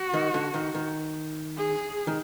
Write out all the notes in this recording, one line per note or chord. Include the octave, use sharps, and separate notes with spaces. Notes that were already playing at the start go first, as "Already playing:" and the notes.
Already playing: F#4
D#3
D3
D#3
D#3
G#4
D#3